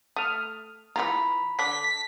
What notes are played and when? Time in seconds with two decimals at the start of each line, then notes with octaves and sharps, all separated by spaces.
0.16 A3 D#6 F6
0.96 E3 E4 F4 A#5 B5
1.59 D3 D4 B6